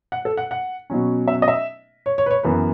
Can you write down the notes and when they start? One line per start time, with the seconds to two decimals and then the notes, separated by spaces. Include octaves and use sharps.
0.12 F#5
0.25 A4
0.37 F#5
0.51 F#5
0.90 B2 F#3 C#4
1.28 E5
1.42 D#5
1.48 E5
2.06 C#5
2.18 C#5
2.26 B4
2.31 C#5
2.43 F#2 E3 B3 B4